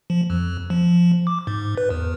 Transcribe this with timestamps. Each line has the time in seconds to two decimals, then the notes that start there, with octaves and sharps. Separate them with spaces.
0.10 F3
0.30 F2
0.70 F3
1.27 D6
1.47 G#2
1.78 B4
1.90 E2